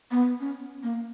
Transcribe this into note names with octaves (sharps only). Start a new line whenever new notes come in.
B3
C#4
A#3